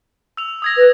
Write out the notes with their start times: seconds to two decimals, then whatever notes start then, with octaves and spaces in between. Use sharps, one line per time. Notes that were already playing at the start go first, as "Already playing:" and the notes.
0.37 E6 F7
0.62 D#6 G#6 A#6
0.77 B4